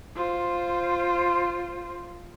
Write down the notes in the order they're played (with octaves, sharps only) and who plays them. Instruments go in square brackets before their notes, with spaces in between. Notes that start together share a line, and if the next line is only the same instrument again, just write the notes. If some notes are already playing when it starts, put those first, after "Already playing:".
[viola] F4 C5